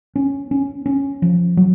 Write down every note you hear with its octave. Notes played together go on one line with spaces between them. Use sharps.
C#4
C#4
C#4
F3
F#3